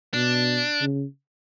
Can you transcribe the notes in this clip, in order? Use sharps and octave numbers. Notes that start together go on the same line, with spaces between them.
B2 D4
C#3